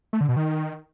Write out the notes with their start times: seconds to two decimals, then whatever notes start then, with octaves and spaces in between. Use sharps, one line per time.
0.13 A3
0.21 D3
0.29 B2
0.36 D#3